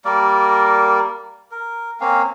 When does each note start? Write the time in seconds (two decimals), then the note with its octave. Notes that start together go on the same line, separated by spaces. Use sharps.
0.05 G3 A#3 A#4 D5
1.51 A#4
2.00 A#3 C4 C#4 F5